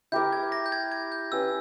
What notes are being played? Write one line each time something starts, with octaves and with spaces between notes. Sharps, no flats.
E4 G4 A#4 E5 G6
G#6
A#6
G6
G#6
G#6
G6
C#4 G4 B4 E6